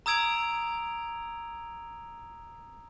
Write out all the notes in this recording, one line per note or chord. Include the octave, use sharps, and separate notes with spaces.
A#5 D#6 E6 G#6 D7 F7